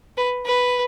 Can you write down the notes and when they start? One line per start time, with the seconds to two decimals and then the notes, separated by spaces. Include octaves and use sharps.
0.17 B4
0.46 B4